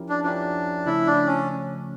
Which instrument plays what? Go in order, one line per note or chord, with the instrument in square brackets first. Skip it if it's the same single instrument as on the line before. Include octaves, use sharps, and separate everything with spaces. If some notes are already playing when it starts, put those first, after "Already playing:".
Already playing: [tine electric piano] F3 C#4 E4 G4 A#4
[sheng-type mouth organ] D4
[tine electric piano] F3 C#4 E4 G4 A#4 [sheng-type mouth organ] D4
[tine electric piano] C#3 F3 A3 C#4 [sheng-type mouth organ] E4
[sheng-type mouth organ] D4
C#4